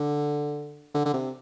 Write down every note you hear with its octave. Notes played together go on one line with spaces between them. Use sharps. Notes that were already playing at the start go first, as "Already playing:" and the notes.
Already playing: D3
D3
D3
C3